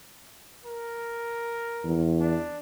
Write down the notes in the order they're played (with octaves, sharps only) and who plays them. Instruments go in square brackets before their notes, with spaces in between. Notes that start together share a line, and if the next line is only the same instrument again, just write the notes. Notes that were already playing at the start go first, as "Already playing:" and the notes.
[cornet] A#4
[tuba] E2
[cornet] D4